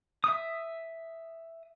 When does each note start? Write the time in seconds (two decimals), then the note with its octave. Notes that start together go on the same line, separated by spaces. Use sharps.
0.24 E5 D#6